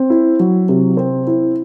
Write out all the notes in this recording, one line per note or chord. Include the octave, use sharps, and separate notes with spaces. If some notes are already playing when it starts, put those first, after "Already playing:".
Already playing: C4
E4
F#3
C3
C4
E4